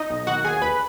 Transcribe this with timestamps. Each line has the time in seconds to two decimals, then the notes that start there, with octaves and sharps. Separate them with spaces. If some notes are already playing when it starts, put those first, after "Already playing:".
Already playing: D#4 D#5
0.10 B1
0.27 D#2 F#4 F#5
0.45 D#2 G#4 G#5
0.62 D2 B4 B5